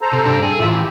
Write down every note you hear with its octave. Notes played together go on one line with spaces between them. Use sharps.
A4 C5 A#5
C3
G2 D4
G#4 A4
A2 E3 F4 E5 E6
G4